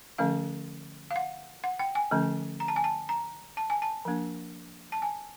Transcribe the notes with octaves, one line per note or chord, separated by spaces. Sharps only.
D3 F3 A3 C#4 F5
F5
F#5
F#5
G5
G#5
D3 F3 A3 C#4
A#5
A5
G#5
A5
A#5
A5
G#5
A5
F3 A#3 D4
A5
G#5